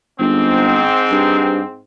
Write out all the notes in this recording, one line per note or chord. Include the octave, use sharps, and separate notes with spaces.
G1 G#2 C4
G2